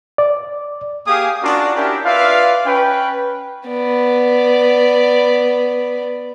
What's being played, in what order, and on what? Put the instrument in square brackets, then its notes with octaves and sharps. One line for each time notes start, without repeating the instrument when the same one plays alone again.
[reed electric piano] D5
[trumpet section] A#3 G4 G#4 F5 G#5 D#6
C#4 D4 F4 F#4 A#4 D5
C#4 D4 E4 G4 A#4
F4 B4 D5 E5 F5
C#4 B4 G5
[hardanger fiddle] B3 D5